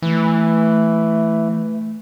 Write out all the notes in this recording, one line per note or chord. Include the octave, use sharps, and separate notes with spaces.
E3 A3